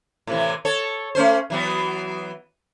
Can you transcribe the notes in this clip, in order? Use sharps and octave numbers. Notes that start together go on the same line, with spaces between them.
A2 C3 E3
A4 C#5
A3 C#4 C5
E3 F#3 B3